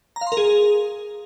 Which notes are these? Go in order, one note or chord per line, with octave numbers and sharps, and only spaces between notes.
A#5
F5
C6
A#4
G#4